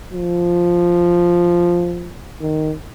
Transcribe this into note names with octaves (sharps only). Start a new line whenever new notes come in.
F3
D#3